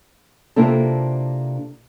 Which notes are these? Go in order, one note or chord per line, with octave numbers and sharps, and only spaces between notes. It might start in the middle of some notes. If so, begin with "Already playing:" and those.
C3 A#3 D4 E4 F4 A4